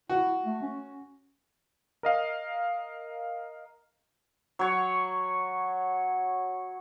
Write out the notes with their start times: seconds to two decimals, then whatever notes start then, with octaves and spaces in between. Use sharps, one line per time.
0.10 E4 F#4
0.45 A3
0.62 C#4
2.03 A#4 D#5 F5
4.59 F#3 C#5